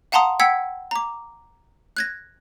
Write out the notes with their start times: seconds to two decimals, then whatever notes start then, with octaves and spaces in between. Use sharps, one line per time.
0.12 F5 F#5 A5 A#5 C6 D#6
0.40 F#5 G5 E6 G#6 B6 C#7
0.91 A#5 D6
1.97 F#6 G#6 A#6